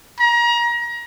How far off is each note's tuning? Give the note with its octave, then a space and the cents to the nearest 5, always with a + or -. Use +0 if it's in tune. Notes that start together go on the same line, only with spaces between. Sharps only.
A#5 +30